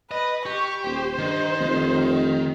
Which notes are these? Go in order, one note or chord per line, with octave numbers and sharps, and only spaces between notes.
B4 D#5
G4 C#6
D#1 C5
G2 D#3
F1